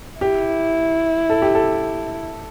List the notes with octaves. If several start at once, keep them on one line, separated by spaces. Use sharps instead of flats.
E4 G4
A4
G4
A4